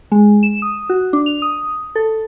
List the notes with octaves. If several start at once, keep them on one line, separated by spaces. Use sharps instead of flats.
G#3
E7
D#6
F#4
D4
F7
D#6
A4